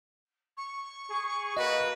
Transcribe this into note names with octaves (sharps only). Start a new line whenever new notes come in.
C#6
G#4
A#3 F#4 B4 D#5